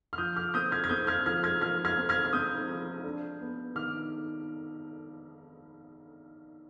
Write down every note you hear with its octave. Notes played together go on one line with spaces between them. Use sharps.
F6
F3 D#6 G6
D6 F6
C4 D#6 G6
F6 G#6
G#6
C4 D#6 G6
F6 G#6
F3 F6 G#6
F6 G#6
F3 F6 G#6
F6 G#6
C4
F6 G#6
F6
C4 D#6 G6
F3
D4
B3
D#3 D6 F6